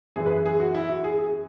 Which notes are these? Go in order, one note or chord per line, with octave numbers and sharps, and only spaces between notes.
F#2 E3 G#4
B4
G#4
G#4
F#4
E4
F#4
G#4
G#4